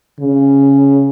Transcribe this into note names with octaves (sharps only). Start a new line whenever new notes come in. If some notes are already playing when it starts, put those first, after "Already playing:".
C#3